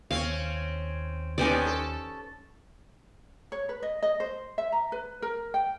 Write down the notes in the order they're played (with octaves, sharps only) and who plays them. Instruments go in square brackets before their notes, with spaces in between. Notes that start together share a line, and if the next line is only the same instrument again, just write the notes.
[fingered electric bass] D#2 D#3 [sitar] C4 C#4 [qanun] F5
[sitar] G2 B3 D#4 [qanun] C#4 C5 D5
[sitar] A4
[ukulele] C#5
B4
D#5
D#5
C5
E5
A#5
B4
A#4
G5